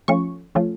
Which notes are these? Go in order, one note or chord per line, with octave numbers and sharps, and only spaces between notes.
F3 A3 C#4 F4 C#6
F3 A3 C#4 F4